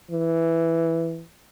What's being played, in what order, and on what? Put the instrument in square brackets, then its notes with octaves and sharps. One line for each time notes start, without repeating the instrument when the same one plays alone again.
[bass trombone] E3